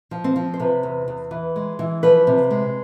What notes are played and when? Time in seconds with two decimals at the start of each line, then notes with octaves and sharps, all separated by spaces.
0.11 F3
0.24 C4
0.36 F3
0.54 C5
0.60 C3 B4
0.83 E2
1.08 E2
1.31 E3
1.56 G#3
1.79 E3
2.03 F3 B4
2.27 C3
2.51 G#3